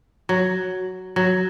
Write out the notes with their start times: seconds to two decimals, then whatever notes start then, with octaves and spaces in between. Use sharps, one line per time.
0.29 F#3
1.16 F#3